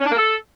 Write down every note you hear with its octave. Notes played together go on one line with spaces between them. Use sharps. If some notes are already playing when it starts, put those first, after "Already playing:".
C#4
D4
A#3
A4